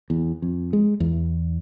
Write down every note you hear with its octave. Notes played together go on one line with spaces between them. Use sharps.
E2
F2
G#3
E2